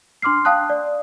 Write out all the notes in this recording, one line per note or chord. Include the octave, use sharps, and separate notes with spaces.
D4 C6 D6 F6 C7
F5 G5 A5 D#6 F#6
D5